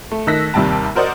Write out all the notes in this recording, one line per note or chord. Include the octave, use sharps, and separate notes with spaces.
A3
D#3 A3 E6 F#6 A#6 B6
D#2 C3 G3 G5 A5
F#4 A#4 C5 D5 D#5 F#5